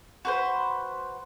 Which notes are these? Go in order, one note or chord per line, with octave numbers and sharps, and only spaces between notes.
F#4 B4 C5